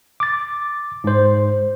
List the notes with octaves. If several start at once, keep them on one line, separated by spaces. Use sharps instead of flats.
D6 A6
G#2 C5